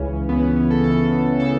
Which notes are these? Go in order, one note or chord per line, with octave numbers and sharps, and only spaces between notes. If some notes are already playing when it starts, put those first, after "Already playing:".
Already playing: C#2 C#3 E3 C#4
C#2 C#3 E3 B3
C#4
C#4
A4
C#2 C#3 E3 A4
C#3 E3 A4